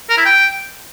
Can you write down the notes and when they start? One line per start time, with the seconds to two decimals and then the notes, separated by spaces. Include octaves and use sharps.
0.09 A#4
0.17 E4
0.25 G5